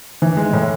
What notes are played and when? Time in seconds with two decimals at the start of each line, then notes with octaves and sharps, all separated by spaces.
0.22 E3
0.37 G#3
0.53 A2